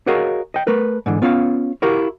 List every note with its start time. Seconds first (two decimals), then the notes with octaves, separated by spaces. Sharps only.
0.07 F#4 G#4 A#4 C#5 D#5 F5
0.54 D#5 G5
0.67 A3 A#4 B4
1.06 G#2 D3 E3
1.22 B3 C#4 F4 C#5 D5 F5
1.82 E4 F#4 G4 A#4 F5